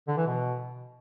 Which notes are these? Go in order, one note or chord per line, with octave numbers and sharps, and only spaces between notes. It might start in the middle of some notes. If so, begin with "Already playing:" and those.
D3
E3
B2